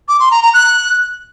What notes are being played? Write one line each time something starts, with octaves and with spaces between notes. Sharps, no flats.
D6
C6
A#5
A#5
F#6